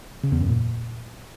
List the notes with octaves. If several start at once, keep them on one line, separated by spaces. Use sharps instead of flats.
C#3
E2
F#2
A#2